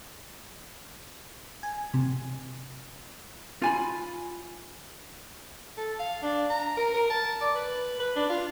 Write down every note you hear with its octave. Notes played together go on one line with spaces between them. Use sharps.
G#5
C3
F4 G#5 B5
A4
F5
D4
A#5
A#4
A#4
A5
D5
B4
B4
D4
F4